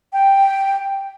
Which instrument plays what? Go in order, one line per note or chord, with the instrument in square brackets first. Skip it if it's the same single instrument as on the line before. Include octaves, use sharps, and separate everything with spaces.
[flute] G5